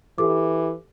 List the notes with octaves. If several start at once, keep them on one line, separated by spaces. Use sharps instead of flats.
E3 G4 A4 D6